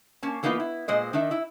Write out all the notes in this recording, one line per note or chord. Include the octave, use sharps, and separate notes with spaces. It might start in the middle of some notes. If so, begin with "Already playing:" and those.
A#3 C#4 A5
E3 A#3 B3 D#4 F4 B4
E4
A#2 G#3 C5 D#5
D#3 D4 D#4 E5
E4 E5